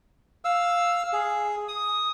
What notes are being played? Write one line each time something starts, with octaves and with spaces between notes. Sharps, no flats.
F5 E6
G#4
D#6